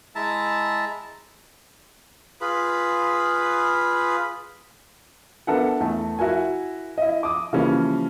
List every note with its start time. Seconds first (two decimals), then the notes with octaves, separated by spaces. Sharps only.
0.16 G#3 E4 E5 A5 A#5
2.41 F4 G#4 B4 B5
5.47 B3 D4 A4 A#4 E5 F#5
5.80 E2 A3
6.19 E4 F#4 A#4 G#5
6.98 E4 D#5
7.23 D6 D#6
7.53 C#3 E3 F3 G3 A#3 C#4